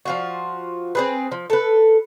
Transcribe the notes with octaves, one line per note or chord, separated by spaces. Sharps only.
F3 F4 F#4
C4 G#4 B4
F3
A4 B4